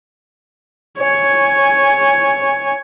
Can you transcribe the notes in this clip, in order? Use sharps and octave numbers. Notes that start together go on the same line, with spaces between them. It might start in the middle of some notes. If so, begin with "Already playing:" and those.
C#5 G#5